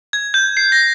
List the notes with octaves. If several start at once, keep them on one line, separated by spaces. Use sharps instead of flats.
G#6
G6
C7
A#6